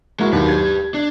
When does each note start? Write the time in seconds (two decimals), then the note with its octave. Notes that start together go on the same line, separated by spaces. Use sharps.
0.20 G#3 A#3 E4 F#4
0.33 D#2 B2 F#3 G4 B4
0.48 G#6
0.94 D4